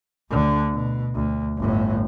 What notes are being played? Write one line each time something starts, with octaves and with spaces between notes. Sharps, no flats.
D2 D3
B2
D2
G1 A2